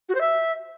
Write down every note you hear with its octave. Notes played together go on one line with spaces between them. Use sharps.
F#4
C5
E5